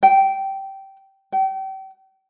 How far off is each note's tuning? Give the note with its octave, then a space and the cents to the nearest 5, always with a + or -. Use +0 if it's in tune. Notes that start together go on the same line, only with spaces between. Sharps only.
G5 -15
G5 -35